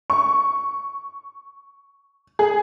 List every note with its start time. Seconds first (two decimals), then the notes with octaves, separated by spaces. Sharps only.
0.10 C#6
2.39 G#4